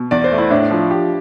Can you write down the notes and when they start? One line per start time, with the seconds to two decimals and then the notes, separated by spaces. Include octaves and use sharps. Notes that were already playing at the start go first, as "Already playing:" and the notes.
Already playing: B2
0.11 E2 D5
0.24 C5
0.32 A3
0.38 E4
0.51 A2 D4
0.71 F3
0.91 G4